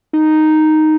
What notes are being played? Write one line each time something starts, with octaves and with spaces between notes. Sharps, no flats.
D#4